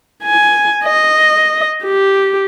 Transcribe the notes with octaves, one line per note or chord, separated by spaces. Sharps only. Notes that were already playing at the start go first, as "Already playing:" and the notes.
G#5
D#5
G4